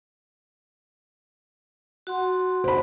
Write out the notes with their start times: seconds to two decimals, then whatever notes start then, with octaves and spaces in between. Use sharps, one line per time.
2.07 F#4 F#5 C6
2.64 C5 B5